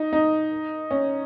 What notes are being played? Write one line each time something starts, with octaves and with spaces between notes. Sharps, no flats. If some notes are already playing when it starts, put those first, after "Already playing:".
Already playing: D#4
D#4
C#4